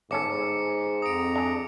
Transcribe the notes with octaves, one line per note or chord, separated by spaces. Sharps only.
G1 G#2 C#4 A4 D6 C#7
F2 A#5 D#6 D7
D4 G#4